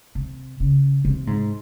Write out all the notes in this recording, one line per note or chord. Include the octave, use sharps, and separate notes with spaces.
C3
C#3
C3
G#2